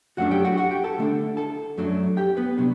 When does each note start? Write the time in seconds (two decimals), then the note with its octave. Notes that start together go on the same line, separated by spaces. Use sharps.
0.17 F#2 F#3 A3 D4 F#4 F#5
0.31 G4 G5
0.45 F#4 F#5
0.57 F#4 F#5
0.71 G4 G5
0.84 A4 A5
0.98 D3 A3 D4
1.37 A4 A5
1.77 F#2 F#3 A3 D4
2.17 G4 G5
2.37 B3 B4
2.57 C3 F#3 B3 D4